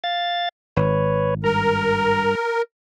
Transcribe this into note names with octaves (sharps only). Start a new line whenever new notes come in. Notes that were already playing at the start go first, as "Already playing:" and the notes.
F5 A6
G#1 B4 C#5
G2 A#4 A#5